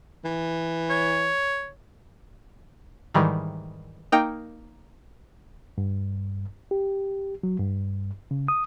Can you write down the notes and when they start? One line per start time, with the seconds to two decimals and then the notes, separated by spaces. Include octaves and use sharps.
0.25 E3
0.90 C#5
3.14 G#2 D#3 E3 G3
4.12 A#3 D#4 A#4 G5
5.78 G2
6.71 G4
7.43 F#3
7.60 G2
8.31 C#3
8.48 D#6